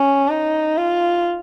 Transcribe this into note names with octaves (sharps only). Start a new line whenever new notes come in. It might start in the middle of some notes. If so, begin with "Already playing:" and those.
Already playing: C#4
D#4
F4